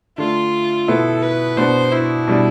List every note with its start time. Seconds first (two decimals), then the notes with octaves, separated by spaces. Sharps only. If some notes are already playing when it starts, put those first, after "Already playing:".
0.17 D3 A3 D4 F4
0.88 B2 B3 E4 A4
1.22 B4
1.57 B2 B3 D4 C5
1.92 E4
2.28 B2 G3 D4